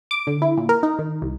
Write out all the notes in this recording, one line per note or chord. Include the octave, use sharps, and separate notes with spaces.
D6
D3
E4
A#2
A#4
D#4
D#3
C2